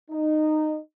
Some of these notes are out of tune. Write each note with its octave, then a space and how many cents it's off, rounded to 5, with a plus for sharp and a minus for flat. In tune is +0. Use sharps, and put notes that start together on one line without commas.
D#4 -15